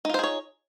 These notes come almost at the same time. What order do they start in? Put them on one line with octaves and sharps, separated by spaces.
D#4 F4 C5 G#4 C#5